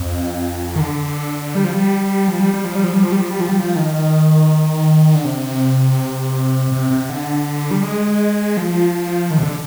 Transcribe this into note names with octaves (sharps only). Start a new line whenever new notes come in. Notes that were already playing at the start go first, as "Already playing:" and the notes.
Already playing: F2
D#3
D3
G3
F3
G3
F3
G3
G3
F3
G3
F3
G3
F3
G3
F3
G3
F3
G3
F3
D#3
D3
C3
C3
C3
D3
G3
G#3
F3
D#3
C3
D3